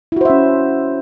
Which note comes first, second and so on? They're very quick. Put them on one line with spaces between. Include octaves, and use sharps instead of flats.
E4 F#4 C5 E5 C#4